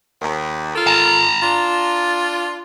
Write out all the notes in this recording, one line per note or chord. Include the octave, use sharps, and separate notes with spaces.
D#2
F4 A4 A#4
A5 A#5
D4 F4